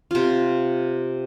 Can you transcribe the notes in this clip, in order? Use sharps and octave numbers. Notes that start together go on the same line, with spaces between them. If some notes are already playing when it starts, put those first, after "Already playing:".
C3 F4